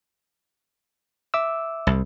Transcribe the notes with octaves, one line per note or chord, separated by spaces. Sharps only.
E5 D6 E6
C2